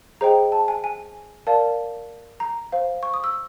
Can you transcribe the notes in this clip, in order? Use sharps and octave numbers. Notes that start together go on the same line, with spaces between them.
G#4 C5 D#5 G5 A#5
A5
G#5
G#5
A#4 D5 F5 A5
A#5
C5 F5
C#6
D#6
E6